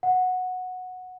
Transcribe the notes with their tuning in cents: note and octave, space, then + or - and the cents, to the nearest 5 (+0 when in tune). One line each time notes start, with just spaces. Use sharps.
F#5 -10